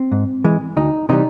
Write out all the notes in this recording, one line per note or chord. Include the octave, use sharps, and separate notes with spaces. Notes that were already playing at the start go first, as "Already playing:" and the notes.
Already playing: C4
G#2
E3 G#3
D2 D#4
C3 E3 G3 D#4